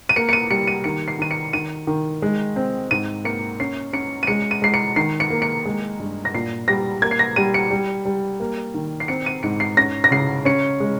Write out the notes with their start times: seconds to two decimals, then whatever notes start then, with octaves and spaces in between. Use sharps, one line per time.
0.09 D#7
0.16 A#3 C#7
0.29 C#7
0.33 D#7
0.51 G3 C#7
0.67 D#7
0.84 D#3 C#7
1.08 C7
1.19 D#3 D#7
1.31 C#7
1.53 D#3 D#7
1.87 D#3
2.22 G#3
2.56 C4
2.91 G#2 D#7
3.24 A#3 C#7
3.60 C#4 C7
3.93 C#4 C#7
4.23 D#7
4.27 G#3 C#7
4.51 D#7
4.62 G#3 C7
4.74 C#7
4.96 D#3 C7
5.20 C#7
5.30 A#3
5.42 C#7
5.65 G#3
6.00 G2
6.25 A#6
6.34 A#2 C7
6.68 G3 A#6
7.02 A#3 G#6
7.11 C7
7.19 A#6
7.36 G3 D#7
7.54 C#7
7.71 G3
8.05 G3
8.40 A#3
8.74 D#3
9.00 C7
9.08 C4 C#7
9.26 D#7
9.43 G#2 C#7
9.60 C7
9.77 C#4 A#6
10.04 A#6
10.11 C#3 C7
10.45 C#4 C#7
10.80 G#3